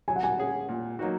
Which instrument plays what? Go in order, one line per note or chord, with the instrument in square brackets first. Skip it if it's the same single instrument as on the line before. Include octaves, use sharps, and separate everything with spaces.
[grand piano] F#3 [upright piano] G#5
[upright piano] F#5
G#5
[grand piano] C#4 G#4
A#2
F#3 A#3 D#4 F#4